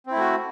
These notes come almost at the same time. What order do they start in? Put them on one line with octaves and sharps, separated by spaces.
C4 E4 A3 F#4